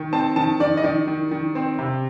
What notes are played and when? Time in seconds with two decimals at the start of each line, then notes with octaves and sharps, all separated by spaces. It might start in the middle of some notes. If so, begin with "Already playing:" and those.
Already playing: D#3
0.13 C4 A5
0.36 D#3 A5
0.60 D#3 D5
0.77 D#5
0.84 D#3 D5
1.08 D#3
1.31 D#3
1.55 C4
1.79 C3